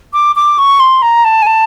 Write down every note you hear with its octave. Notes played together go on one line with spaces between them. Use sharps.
D6
D6
C#6
C6
A#5
A5
G#5
A5